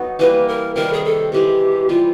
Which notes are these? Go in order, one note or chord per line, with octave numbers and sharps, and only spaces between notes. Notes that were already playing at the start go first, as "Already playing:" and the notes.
Already playing: F#3 B3 D#4 F#4
E3 G3 A#3 B4
A#4
C3 D#3 G3 A#4
G#4
A4
C3 E3 G#3 G4
E3 G3 C4 F4